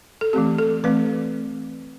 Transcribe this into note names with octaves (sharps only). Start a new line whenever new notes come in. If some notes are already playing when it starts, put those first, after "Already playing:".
A4
E3 A3 C4 G4
A4
E3 A3 C4 B4